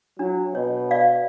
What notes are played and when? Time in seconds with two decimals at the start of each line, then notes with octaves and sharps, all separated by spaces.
0.19 F#3 D4
0.55 B2 C#5
0.91 D5 D#5 F5